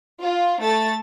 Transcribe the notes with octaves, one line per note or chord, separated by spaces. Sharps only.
F4
A3 A6